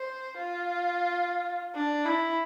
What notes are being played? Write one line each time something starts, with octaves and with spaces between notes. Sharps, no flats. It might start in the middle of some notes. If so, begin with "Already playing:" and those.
Already playing: C5
F4
D4
E4